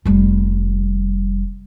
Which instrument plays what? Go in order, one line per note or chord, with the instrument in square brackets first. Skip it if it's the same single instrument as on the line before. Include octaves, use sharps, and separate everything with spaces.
[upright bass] F1 G3